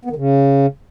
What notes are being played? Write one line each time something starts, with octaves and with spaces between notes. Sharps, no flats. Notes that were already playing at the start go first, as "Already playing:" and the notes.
B3
D#3
C#3